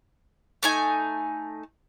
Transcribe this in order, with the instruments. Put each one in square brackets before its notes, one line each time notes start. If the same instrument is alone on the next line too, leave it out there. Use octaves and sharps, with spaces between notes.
[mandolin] A3 D#4 G#5